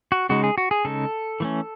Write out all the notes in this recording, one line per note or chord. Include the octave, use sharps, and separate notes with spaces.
F#4
C#3 G#3 D#4 F#4
G#4
F#4
G#4
C#3 G#3 D#4 A4
E3 A3 C#4